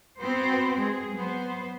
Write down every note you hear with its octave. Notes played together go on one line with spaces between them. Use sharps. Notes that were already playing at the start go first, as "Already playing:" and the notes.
B3 C4 F#4 C5
G#3 G#4
F#3 B3 C5